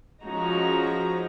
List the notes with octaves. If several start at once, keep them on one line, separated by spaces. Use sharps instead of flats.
F3 G#3 C#4 D#4 F#4 A#5